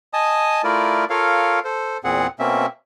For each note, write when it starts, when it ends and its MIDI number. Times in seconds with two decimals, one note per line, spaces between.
0.13 0.62 75
0.13 0.62 80
0.13 0.62 81
0.13 0.62 87
0.64 1.05 57
0.64 1.05 64
0.64 1.05 65
0.64 1.05 70
0.64 1.05 74
1.10 1.59 65
1.10 1.59 69
1.10 1.59 70
1.10 1.59 73
1.10 1.59 77
1.65 1.98 69
1.65 1.98 72
2.04 2.27 40
2.04 2.27 46
2.04 2.27 60
2.04 2.27 68
2.04 2.27 78
2.39 2.66 47
2.39 2.66 58
2.39 2.66 60
2.39 2.66 61
2.39 2.66 76